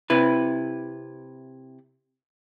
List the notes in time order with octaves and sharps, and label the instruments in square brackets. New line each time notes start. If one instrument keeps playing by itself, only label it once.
[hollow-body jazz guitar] C3 E4 B4